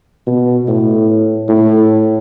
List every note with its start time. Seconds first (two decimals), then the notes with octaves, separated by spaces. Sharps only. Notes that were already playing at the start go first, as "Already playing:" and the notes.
0.26 B2
0.68 A2
1.49 A2